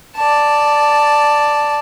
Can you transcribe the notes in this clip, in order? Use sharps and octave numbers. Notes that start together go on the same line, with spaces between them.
D5 A5